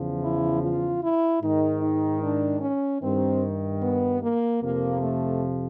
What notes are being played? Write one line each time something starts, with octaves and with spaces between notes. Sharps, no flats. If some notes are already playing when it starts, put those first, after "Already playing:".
Already playing: E2 C#3 F3
E4
F4
E4
G#2 D#3 D#4
D#4
D4
C#4
G2 D#3 C4
B3
A#3
F2 C3 F3 A#3
A3